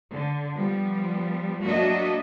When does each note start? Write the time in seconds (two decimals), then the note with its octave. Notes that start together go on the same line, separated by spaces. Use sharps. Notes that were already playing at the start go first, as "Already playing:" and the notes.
0.11 D3
0.57 F3 G3 B3
1.65 F#3 A#3 D4 F#4 D#5 E5